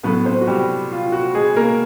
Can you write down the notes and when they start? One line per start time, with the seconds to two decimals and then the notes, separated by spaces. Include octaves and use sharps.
0.03 A2 F#3 A3 B3 B4
0.25 C4 C5
0.41 F#4
0.47 G3 G4
0.92 F4
1.12 F#4
1.35 G#3 G#4
1.56 A#3 A#4